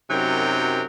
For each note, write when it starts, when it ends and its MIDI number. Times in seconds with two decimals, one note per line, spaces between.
0.10 0.84 42
0.10 0.84 48
0.10 0.84 54
0.10 0.84 63
0.10 0.84 70
0.10 0.84 79